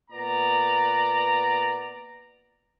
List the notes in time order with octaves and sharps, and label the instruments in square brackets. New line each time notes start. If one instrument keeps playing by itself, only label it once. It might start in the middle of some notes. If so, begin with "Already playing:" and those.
[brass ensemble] A#2 B3 B4 D5 A#5